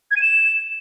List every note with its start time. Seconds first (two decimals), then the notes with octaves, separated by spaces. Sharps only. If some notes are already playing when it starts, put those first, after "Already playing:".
0.11 G#6
0.16 D#7
0.22 E7